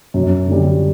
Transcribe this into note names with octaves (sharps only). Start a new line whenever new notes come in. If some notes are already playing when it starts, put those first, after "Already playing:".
F#2
D3 G3